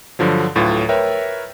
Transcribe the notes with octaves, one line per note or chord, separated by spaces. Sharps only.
G2 D3 F3 F#3
D2 A2 F#3 F4 B4 A6
A#4 B4 C#5 E5 G5